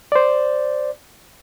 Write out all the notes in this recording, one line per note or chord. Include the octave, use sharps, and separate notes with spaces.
C5 D5